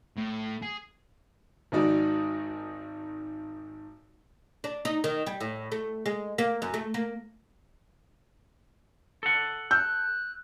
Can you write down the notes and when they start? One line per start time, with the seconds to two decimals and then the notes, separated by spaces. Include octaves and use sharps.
0.17 A2
0.62 G#4
1.72 G#1 G#2 D#3 D#4 F#4 D5
4.64 D4
4.85 D#4
5.04 D#3
5.27 G3
5.41 A2
5.72 A3
6.06 G#3
6.38 A#3
6.62 F#2
6.74 A3
6.94 A#3
9.23 A4 F#5
9.71 E6 F#6 G6